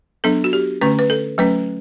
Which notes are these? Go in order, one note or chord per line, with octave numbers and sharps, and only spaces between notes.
F#3 B3 D4 A4
F#4
G4
D3 A3 C#4 B4
B4
A4
F#3 A3 C#4 B4